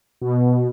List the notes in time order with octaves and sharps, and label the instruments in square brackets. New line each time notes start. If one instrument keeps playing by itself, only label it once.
[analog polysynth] B2